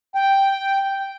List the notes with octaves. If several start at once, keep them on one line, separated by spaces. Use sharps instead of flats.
G5